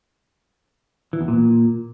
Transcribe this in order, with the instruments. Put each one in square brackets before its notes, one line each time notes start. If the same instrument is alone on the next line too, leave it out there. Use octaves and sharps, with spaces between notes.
[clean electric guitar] E3
E2
A#2